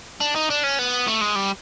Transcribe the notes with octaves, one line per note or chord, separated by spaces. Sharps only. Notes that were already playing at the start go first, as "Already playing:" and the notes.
D4
D#4
D4
C#4
B3
A3
G#3
G3